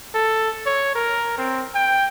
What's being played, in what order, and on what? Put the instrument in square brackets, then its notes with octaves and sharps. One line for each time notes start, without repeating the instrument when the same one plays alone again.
[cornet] A4
C#5
A#4
C4
G5